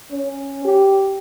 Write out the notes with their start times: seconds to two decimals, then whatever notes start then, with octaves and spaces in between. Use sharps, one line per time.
0.11 C#4
0.65 G4